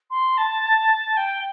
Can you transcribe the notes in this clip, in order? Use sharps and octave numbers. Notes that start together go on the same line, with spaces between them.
C6
A5
G5